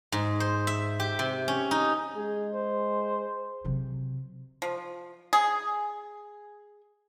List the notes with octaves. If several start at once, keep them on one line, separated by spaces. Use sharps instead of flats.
G#2
C5
E5
G4
C3
C#4
D#4
G#3 G#4
C5
C3 F#3
F3
G#4